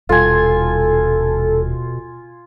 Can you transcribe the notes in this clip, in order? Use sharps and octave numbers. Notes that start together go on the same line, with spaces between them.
D#1 B2 G3 F4 A4 G#5